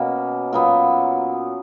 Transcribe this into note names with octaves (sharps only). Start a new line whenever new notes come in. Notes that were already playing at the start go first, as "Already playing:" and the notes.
Already playing: B2 A#3 C#4
A#2 F#3 B3